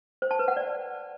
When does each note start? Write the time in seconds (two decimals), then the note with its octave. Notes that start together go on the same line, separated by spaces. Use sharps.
0.22 C5
0.31 A5
0.39 B4
0.48 F#5
0.57 D5